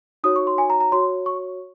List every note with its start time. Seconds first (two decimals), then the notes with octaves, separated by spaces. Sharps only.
0.24 D#4 F#4 C#5 D#6
0.36 C#6
0.47 C6
0.58 G#5
0.70 A#5
0.80 A#5
0.92 F#4 C#5 C6
1.26 C#6